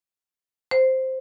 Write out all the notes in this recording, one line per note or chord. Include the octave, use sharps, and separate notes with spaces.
C5